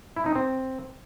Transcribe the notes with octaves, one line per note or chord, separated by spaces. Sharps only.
E4
D#4
C4